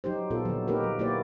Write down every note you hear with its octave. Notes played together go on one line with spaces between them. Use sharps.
F#3 D#4 G4 C5
A#2 B3 F4 A4
D3 F#3
A#3 D#4 G4 A#4 B4
F#3
A#3 E4 F#4 G4 C5 D5